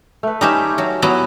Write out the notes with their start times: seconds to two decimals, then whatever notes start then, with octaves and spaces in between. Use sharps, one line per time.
0.23 A3 B4
0.41 G3 C#4 D#4 G4 B4 E5
0.78 F#3
1.02 F#3 B3 E4